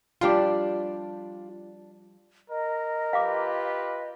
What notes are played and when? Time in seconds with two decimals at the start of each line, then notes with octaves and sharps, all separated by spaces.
0.21 F3 G3 D4 F4 G4 A5
2.50 A#4 D#5
3.13 F4 G4 B4 F5 D6